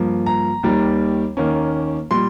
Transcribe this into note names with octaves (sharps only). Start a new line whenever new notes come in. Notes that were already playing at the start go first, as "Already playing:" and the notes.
Already playing: G2 F3 A#3
A#5
D#2 D#3 G3
D#2 D#3 A#3 C#4
A#2 G3 C6